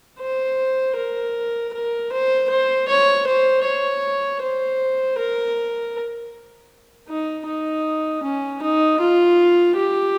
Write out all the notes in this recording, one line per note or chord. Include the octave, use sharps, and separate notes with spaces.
C5
A#4
A#4
C5
C5
C#5
C5
C#5
C5
A#4
D#4
D#4
C#4
D#4
F4
G4